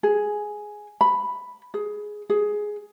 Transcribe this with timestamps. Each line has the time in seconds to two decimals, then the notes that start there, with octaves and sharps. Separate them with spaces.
0.03 G#4
1.01 B5
1.74 G#4
2.30 G#4